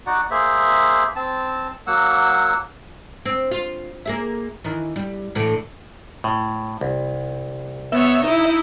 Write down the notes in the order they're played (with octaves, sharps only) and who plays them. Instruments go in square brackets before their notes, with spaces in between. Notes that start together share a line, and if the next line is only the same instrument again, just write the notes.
[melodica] D#4 F#4 D5 F#5
A#3 G#4 C5 E5
C4 A5
F#3 A#3 F#5 E6
[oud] C4
F4
A#3 G#4 E5
D#3 E3
G3
A2 D3 E3
[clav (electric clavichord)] A2
C2
[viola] B3 C#5 [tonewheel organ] E5
[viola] D#4 E4